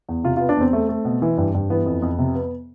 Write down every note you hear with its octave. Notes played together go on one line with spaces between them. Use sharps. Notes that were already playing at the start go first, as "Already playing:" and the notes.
E2
C3 F4
B3 F4
D4
E2 C4
A3
A3
B2
E3
G2
G2
E3 B3
F2
F2
C3
B3